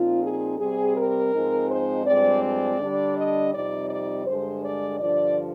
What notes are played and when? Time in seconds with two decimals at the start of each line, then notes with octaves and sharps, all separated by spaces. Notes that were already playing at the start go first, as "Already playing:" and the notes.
Already playing: A#2 F3 C4 D#4 F4
0.23 G#4
0.59 C3 G3 C4 G#4
0.96 A#4
1.33 G#2 F3 G#3 C4 D#4
1.69 C5
2.06 G2 F3 G#3 C4 D5
2.43 D5
2.80 D3 G3 D4
3.17 D#5
3.54 F2 C3 G3 C4 D#4 D5
3.90 D5
4.27 G2 D3 G#3 C5
4.63 D5
5.00 G2 D3 F3 D5